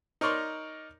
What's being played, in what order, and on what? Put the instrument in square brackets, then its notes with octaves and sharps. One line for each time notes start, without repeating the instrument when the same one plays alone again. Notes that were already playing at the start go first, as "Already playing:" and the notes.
[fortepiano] D#4 A#4 C#5 D5 C6 C#6